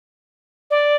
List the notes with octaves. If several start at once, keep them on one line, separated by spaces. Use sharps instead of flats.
D5